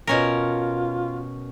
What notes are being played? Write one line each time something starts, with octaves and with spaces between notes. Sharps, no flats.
B2 C#4 F4 A#4